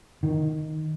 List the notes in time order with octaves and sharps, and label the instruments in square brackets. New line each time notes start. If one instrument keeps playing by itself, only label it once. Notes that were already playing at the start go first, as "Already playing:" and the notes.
[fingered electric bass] D#3